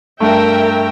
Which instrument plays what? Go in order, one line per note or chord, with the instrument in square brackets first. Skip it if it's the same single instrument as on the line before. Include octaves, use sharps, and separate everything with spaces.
[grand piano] G2 A3 [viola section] A#4 E5 G5